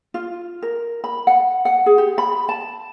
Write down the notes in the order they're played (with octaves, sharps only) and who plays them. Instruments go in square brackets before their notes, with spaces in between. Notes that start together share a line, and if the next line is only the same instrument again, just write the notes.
[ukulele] F4
A#4
B5
F#5
F#5
G#4
G4
B5
A5